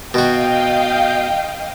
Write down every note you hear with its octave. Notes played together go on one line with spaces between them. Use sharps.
B2 F#4 D#5 F5 G5